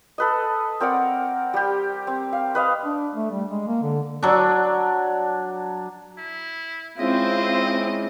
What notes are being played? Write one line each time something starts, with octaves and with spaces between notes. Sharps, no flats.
A4 B4 D#5
C4 A#4 D5 F#5
G3 G4
C4
F5
B4 D#5 F5
D4
A3
G3
G#3
A#3
D3
F#3 D4
E4
G#3 C4 C#4 E4 F4 D#5